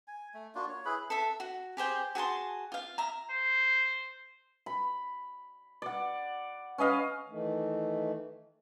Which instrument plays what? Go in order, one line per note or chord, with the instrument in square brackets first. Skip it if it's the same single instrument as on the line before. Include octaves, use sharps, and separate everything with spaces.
[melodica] G#5
A3
A#3 D4 F4 F#4
C#5
E4 G#4 B4 B5
[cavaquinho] A4 E5
F#4
G4 G#4 C5 G5
F#4 G#4 A5 C6
F4 F5
E5 A#5
[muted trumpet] C5
[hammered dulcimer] B5
D5 F#5
C#4 B4 D#5 F5
[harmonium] D#3 E3 A3